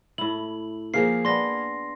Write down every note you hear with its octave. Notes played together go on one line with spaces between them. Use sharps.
A2 E4 F#7
F3 A#3 G#4 A#4 C7
B3 D4 C6 A#6